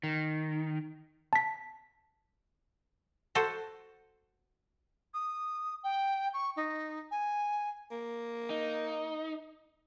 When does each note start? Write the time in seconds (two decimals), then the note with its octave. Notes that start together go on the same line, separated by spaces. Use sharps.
0.03 D#3
1.33 A5 B6
3.35 F#4 A4 C5
5.14 D#6
5.84 G5
6.34 C#6
6.56 D#4
7.11 G#5
7.91 A#3
8.50 D#4